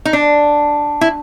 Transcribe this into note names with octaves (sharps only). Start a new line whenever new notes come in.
D#4
D4
E4